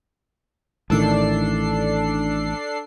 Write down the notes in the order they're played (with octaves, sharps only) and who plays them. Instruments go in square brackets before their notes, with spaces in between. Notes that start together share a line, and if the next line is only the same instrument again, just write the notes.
[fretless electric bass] A1 A2 D#3 [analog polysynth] D4 A4 C7